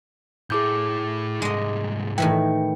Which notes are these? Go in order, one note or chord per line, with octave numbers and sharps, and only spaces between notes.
A2 E4 G#4 D6 G6
C2 G#2 G#3 D#5
A2 D#3 E3 G5